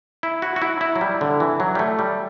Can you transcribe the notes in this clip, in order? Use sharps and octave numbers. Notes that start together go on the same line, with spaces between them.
E4
F#4
F#4
E4
E4
F#3
G3
D3
E3
F#3
G3
A3
G3